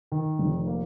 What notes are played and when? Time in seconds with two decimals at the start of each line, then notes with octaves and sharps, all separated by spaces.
0.12 D#3
0.39 F1
0.67 A#3